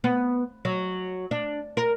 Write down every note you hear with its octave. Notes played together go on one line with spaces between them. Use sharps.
B3
F#3
D4
A#4